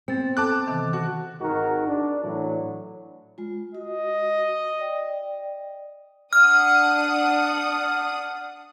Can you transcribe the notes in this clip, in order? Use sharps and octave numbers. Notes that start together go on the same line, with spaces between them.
B3 C4 A6
A4 A5 D6 F#6
C3 D#3 E3
F#4 F#6
G#1 G#2 D#3 G#3 F#4 A#4
D4
A2 E3 F#3
G#3 F4
F#4 D#5
D5 G5
D4 F#5 D#6 F6